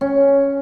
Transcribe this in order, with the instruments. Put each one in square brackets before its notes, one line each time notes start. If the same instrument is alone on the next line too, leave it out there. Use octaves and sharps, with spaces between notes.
[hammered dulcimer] C#4